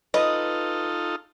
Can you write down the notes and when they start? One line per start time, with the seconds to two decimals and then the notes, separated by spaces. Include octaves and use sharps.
0.14 D#4 F4 A4 B4 D#5